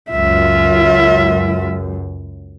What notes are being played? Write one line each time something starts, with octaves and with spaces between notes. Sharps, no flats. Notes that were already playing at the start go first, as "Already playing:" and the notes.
C#2 F#2 F4 E5